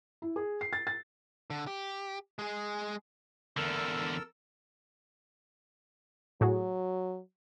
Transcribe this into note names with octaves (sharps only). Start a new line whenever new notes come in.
E4
G#4
C7
A6
A6
D3
G4
G#3 G#4
E2 D3 A4 A#4 E6
A2 F#3 F#4 G#4